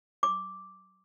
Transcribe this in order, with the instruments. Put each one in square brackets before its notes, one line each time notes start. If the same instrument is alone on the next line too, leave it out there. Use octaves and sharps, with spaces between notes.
[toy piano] D6